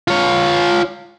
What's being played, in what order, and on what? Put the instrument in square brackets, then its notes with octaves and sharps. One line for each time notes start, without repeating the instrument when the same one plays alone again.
[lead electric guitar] F4 C#5